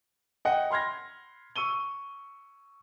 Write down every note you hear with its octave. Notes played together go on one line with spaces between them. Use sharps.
D#5 F#5 G5
B5 C6 F6 G#6 A#6
C#6 E6 D#7 G7